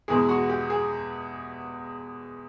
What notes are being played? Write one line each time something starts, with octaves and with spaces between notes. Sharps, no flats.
E2 B2 G#3 G#4
F#4
G4
G#4